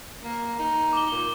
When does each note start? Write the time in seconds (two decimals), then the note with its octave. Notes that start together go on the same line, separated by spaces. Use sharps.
0.24 A#3
0.59 D#4
0.93 D6 G7
1.12 A#2